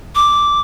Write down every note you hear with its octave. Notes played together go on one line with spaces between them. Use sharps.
D6